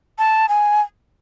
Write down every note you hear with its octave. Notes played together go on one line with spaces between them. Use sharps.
A5
G#5